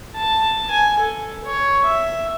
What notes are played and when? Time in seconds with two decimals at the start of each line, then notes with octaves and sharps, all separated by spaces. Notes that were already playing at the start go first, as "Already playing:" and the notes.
0.15 A5
0.71 G#5
0.99 A4
1.44 C#5
1.84 E5